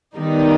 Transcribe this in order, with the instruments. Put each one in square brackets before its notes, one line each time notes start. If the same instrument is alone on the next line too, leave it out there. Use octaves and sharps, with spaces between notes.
[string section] D#3 G3 B3 D#4